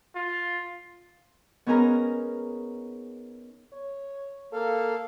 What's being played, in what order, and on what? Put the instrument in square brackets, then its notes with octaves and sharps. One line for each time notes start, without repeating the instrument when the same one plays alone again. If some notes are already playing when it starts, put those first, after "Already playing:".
[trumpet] F4
[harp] B3 C#4 D#4 G#4 A#4 A#5
[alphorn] C#5
[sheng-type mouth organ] A#3 F5 [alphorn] A4